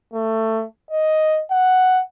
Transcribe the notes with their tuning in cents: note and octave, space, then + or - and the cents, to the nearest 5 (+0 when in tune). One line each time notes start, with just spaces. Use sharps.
A3 +20
D#5 +5
F#5 +5